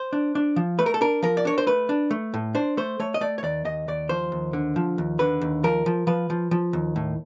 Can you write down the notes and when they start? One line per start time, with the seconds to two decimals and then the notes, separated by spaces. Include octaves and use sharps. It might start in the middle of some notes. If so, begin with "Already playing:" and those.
Already playing: C5
0.13 D4
0.35 D4
0.56 F3
0.79 A3 B4
0.86 A#4
0.94 A4
1.01 D4 A#4
1.22 F3 A#4
1.37 D5
1.45 D4 C#5
1.58 C5
1.67 A3 B4
1.89 D4
2.11 A3
2.34 A2
2.55 D4 C5
2.77 A3 C5
3.00 A3 C#5
3.14 D#5
3.21 A3 D5
3.38 C#5
3.43 D#2 D5
3.65 D#2 D#5
3.88 D#2 D5
4.09 F3 C5
4.32 D#2
4.53 D3
4.76 F3
4.98 D#2
5.19 D3 B4
5.41 D#2
5.64 F3 A#4
5.86 F3
6.07 F3 B4
6.30 F3
6.51 F3
6.73 D#2
6.96 A2